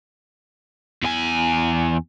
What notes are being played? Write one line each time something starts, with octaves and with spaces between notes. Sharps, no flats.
E2 G#5